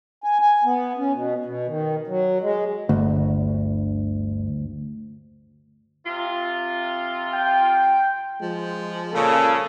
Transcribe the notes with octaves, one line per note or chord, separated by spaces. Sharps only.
G#5
G#5
B3
C#4
B2
B2
D#3
F#3
G#3
G1 D2
C3 F4
G5
F3 G#3
A#2 C#3 A4